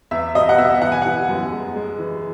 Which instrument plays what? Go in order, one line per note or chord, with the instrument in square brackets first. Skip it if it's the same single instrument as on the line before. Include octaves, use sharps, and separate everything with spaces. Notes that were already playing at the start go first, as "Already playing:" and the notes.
[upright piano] E2 E5
B2 D#5
F#5
B2 E5
E3 F#5
G#5
E3 F#5
F#2
G#3
G#3
E3